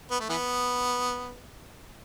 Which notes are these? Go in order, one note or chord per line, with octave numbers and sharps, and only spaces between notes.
B3
A3
E3 B3